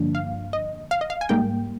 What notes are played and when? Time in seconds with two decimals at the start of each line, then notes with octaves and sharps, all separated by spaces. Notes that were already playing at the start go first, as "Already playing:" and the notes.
Already playing: G2 D3 F3 A#3 D4
0.15 F5
0.53 D#5
0.91 F5
1.01 D#5
1.10 F5
1.21 G#5
1.29 G#2 G3 A#3 G5